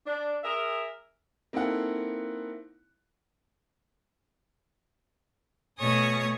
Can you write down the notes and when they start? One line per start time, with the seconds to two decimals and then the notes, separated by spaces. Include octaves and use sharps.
0.06 D4
0.43 G#4 A#4 E5
1.53 A#3 C4 D#4 E4 A4 F#5
5.78 B2 A3 C#5 G#5 C#6 D#6